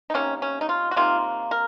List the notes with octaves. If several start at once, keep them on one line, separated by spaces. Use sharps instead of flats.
D#4
C3 D#3 A#3 C#4
C#4
D#4
F4
F#4
C3 D#3 A#3 F4
A#4